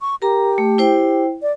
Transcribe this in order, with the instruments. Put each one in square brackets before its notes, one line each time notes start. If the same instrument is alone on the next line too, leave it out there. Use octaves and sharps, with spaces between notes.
[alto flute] C#6
[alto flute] G4 [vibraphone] A#4 A#5
[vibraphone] A3
E4 C5 G5
[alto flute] D5